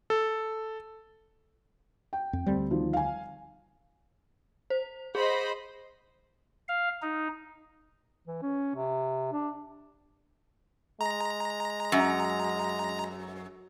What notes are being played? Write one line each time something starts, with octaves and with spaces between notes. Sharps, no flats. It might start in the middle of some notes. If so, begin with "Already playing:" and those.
A4
G5
F2
D2 G3 C4
D#3 F3
F5 G#5
C5
G#4 C5 D#5 B5
F5
D#4
E3
C#4
C3
D4
G#3 A#5
F#2